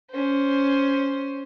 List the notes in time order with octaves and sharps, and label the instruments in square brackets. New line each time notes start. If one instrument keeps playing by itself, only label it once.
[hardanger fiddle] C#4 C5